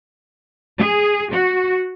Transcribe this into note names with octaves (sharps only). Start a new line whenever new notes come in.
G#4
F#4